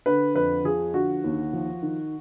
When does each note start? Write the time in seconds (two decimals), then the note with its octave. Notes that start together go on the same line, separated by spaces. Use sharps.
0.06 D3 B4
0.35 F2 B4
0.64 F3 G#4
0.94 D3 F#4
1.24 D#2
1.53 F3
1.82 D#3